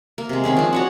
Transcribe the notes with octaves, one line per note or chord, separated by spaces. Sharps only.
A#3
C3 G#3
D#3 C4 C#4 G#4
F3 D4
F#4 C#5 F#5